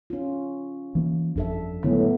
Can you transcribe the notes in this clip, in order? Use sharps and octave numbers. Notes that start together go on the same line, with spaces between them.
C#4 F4
E3 A#3
G1 F2 D4 A4 E5
A2 D3 F#3 G#3 B3